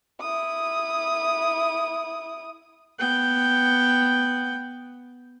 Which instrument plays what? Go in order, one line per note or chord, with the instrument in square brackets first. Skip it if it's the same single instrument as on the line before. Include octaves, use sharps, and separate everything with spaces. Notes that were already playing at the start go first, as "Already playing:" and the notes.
[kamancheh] E4 D#6
[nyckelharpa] B3 G5